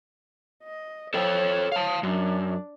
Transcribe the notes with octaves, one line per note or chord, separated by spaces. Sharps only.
D#5
A4 C5 C#5 G5
F5 A5
F#2 D4